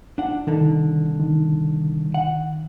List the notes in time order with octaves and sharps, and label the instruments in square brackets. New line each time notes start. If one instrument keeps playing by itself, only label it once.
[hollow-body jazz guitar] D4 F#5
[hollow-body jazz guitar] C2 D3 A4 [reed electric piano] D#3
[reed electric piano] D#3
[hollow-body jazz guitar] F#5